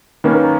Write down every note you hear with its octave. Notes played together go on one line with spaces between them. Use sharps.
D#3 A#3 C#4 B4
A#4